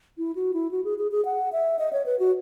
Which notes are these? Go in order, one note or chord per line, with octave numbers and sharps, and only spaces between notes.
E4
F#4
E4
F#4
G#4
G#4
G#4
F#5
E5
D#5
C#5
B4
F#4